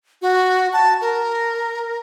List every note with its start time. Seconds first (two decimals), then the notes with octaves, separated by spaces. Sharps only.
0.22 F#4
0.73 A5
1.01 A#4